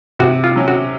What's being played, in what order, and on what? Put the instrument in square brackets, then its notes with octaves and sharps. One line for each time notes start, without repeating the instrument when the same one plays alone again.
[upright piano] C3 [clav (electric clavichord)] F#4
[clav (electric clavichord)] F4
[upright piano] F#3 C#4
[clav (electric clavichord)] F#4